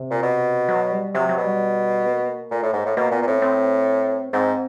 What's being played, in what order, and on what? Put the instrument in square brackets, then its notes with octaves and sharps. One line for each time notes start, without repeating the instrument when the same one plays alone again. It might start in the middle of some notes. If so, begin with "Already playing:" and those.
Already playing: [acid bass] C3
[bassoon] A#2
B2
[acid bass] F#3
G3
[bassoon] C3 [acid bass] F#3
[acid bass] F#3
[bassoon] B2
[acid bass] G3
B3
A#3
B3
A#3
[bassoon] A#2 [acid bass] A3
[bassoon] A2
[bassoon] G#2 [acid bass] A#3
[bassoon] A2
[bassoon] B2 [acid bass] A#3
[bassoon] A#2 [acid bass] B3
[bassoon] A#2
[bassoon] A2 [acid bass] C4
[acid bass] C4
[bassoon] G#2 [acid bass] C4